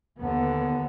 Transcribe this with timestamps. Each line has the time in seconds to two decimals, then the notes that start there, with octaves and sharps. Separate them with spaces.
0.19 D#2 D3 B3